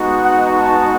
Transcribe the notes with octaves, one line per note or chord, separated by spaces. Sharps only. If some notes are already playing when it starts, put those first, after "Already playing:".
Already playing: G#3 B3 D#4 F#4
F#5
A5